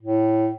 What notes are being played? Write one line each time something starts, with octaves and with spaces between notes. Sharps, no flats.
A2